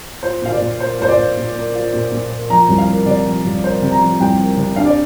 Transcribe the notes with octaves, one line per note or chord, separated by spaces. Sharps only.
F4 C5
A#2 F5
D5
A#2
A#3 C5
F4 C5
D5
A#2
A#2
A#3
F4
A#2
A#2
A#3
F3 A#5
C2
F5
A#3
C3 D5
F3
C2
A#3 C5
C3
A#5
F3
C2 G5
A#3
C3
D4 F5
D5